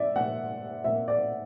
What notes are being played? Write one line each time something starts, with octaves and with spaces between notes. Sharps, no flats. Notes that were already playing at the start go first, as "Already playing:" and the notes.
Already playing: A#2 A#3 D5 E5
A#2 A#3 F#5
A#2 A#3 E5
D5